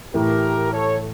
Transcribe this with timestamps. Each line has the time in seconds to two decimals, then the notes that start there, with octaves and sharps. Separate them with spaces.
0.14 A2 E3 A3 G4 A#4
0.72 A4 C#5